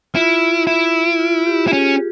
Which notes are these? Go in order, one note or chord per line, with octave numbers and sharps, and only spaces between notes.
E4 F4
E4
F4
G4
E4
C#4 G#4